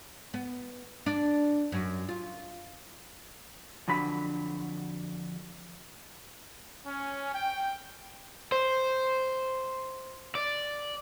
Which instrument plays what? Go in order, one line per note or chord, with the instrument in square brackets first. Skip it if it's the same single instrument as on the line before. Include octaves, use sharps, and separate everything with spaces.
[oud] B3
D4
F#2
F4
[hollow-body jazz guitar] F2 D3 F#3 B5
[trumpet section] C#4
G5
[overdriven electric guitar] C5
D5